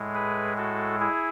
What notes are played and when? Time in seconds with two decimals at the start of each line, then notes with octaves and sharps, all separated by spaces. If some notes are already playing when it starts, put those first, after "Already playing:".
Already playing: A2 G#3
0.14 G#4 B4
0.57 F#4 A4
1.00 E4 G#4